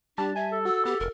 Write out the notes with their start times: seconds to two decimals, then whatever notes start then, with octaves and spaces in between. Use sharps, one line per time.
0.18 G3 D4 G4 A5
0.35 E5 G#5
0.52 A4
0.65 F#4 E6
0.85 B3 G4
1.00 F1 A#4